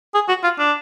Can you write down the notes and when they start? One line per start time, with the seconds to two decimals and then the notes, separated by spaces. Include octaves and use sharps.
0.14 G#4
0.29 F#4
0.44 F4
0.59 D4